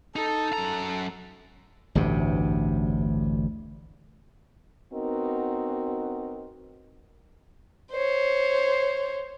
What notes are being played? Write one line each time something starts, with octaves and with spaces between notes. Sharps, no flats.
D#4 A4
F#2 A#5
A1 D2 G2 C3
B3 C4 D#4 F#4 A#4
C5 C#5